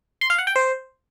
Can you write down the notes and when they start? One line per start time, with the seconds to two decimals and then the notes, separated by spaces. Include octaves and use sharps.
0.21 C6
0.30 F5
0.38 F#5
0.47 G5
0.56 C5